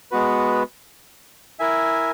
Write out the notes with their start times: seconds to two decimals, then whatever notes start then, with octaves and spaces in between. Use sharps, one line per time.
0.11 G#3 B3 F#4 B4
1.59 E4 A#4 E5 G#5